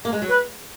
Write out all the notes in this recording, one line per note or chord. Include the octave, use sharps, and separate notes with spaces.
A#3
G#3
F#3
B4